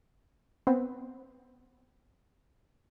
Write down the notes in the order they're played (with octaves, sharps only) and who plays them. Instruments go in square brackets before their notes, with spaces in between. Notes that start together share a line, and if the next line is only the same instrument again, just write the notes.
[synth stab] B3 C4